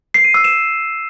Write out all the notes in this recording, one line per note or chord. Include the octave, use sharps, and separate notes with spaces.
C7
D#7
E6
E7